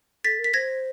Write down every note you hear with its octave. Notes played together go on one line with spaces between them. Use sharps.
A4 A6 B6
A#4
B6
C5 G#6 A#6